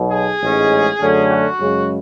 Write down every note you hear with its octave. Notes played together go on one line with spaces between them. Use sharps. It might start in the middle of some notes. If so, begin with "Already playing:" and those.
Already playing: B1 B2 F#3
G#4
A1 G#2 G#3 C#4
F#2 D3 A3 C#4
F#4
F#2 C#3 G#3